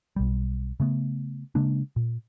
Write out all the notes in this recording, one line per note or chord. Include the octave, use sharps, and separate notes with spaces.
B1 G3
C#3 A3 B3
C#3 G#3 A#3 D4
A#2